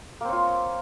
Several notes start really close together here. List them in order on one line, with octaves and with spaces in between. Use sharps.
A#3 C4 C#5 F4